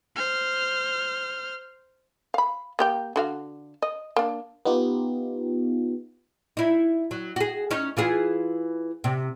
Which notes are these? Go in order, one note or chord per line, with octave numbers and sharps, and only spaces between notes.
C5 F6
F5 B5
A#3 G4 G5
D3 F#4 F5
D#5
A#3 D4
B3 D#4 F4 G4
D#4 E4
F#3
F#4 G#4
C#4 D#4
E3 F4 G#4
C3